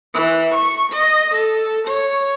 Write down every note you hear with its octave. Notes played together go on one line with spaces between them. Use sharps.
E3
C#6
D#5
A4
C#5